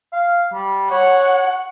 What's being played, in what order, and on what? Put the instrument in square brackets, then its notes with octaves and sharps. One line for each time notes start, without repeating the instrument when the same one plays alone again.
[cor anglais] F5
G3
[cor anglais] C#5 [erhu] F#5